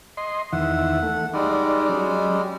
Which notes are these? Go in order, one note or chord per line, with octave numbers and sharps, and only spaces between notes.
D#5 C6
E2 D#3 E5 F#5
A3
G3 G#3 D#4 D5
F#3 C#4